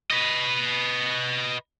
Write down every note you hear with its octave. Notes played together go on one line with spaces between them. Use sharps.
B4 D#5